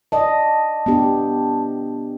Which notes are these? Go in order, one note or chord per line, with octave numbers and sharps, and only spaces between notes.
D5 D#5 A5
B3 D4 G4